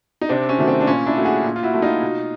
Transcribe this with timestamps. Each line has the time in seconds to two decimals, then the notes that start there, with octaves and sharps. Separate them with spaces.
0.21 D#4
0.29 C3 C4 D4
0.49 C#4
0.58 D#3 F#3 A3
0.68 C4
0.81 D4
0.87 A#2 C#4
1.06 D4 E4
1.16 F#3 A3
1.25 F#4 G#4
1.44 A#2
1.56 F4
1.63 E4 F#4
1.74 F#3 A3
1.82 D#4 F4
2.02 B2